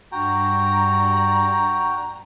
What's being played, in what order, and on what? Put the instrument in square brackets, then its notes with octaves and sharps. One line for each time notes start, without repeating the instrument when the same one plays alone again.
[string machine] G2 D4 D5 [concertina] F#4 G5 [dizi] A#5